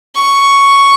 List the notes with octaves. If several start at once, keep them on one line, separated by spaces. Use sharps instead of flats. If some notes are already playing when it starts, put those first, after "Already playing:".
C#6